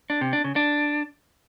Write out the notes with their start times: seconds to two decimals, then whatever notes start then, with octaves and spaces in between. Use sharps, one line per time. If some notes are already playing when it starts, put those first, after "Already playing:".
0.10 D4
0.21 C3
0.33 D4
0.44 C#3
0.56 D4